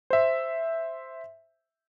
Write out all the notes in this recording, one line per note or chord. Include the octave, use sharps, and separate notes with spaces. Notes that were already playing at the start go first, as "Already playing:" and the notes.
C5 E5